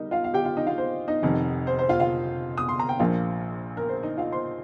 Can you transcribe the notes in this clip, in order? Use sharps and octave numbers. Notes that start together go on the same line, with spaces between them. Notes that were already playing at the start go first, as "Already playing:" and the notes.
Already playing: G3 D#4 A#4 D#5
F4 F5
F5
G4 G5
F4 F5
D#4 D#5
F4 F5
C5
D#4 D#5
F1 F2 D#3
C5
C5
F4 F5
F4 F5
D#6
C6
A#5
G5
A#1 A#2 F3 A#3 F4 F5
A#4
C5
D#4 D#5
F4 F5
C5 C6